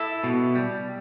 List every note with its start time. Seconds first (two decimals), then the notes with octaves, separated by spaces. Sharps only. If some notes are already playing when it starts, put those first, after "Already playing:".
Already playing: E4 A4
0.24 B2
0.55 G3